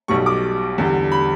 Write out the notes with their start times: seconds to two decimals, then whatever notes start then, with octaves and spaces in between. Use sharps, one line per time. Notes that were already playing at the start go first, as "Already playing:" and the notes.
0.08 B1 B2 G3 C#6
0.26 D6
0.78 E2 D3 G3
1.12 B5